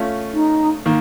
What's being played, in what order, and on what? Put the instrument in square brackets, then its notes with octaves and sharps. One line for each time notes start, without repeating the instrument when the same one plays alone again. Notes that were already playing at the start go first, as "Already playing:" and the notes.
Already playing: [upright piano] A3 C#4 F4
[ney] D#4
[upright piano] D#3 A#3